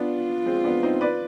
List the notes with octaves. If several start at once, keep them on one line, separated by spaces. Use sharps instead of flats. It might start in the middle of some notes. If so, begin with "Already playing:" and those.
Already playing: B3 D4 F4
G#3 C4
B3 D4
C4 D#4
B4 D5